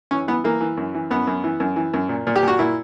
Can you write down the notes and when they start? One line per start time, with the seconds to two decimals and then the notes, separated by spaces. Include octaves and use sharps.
0.11 E3 C#4
0.28 E3 B3
0.44 E3 A#3
0.61 E3
0.77 F#2
0.95 E3
1.11 F#2 B3
1.27 F#2
1.44 E3
1.60 F#2
1.76 E3
1.94 F#2
2.09 A#2
2.27 A#2
2.36 G4
2.43 A#2 F#4
2.59 A#2 E4